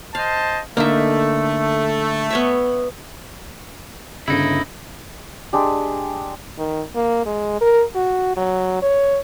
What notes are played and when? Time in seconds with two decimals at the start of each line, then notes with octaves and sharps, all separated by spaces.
0.15 C5 D#5 F5 A5
0.77 D3 A3 A#3 D#4 E5
2.30 B3 C#5 E5
4.28 G1 C#3 D#4 E4
5.53 G#3 D4 G4
6.58 D#3
6.95 A#3
7.26 G#3
7.61 A#4
7.95 F#4
8.37 F#3
8.82 C#5